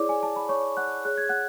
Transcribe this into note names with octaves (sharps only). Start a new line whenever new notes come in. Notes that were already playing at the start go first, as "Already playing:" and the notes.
Already playing: E4 G#4 C#5 D5 D6
G#5
A5
B5
C#5 C#6
F#5 F#6
G#4 C#5 F#6
G#6
F#5 F#6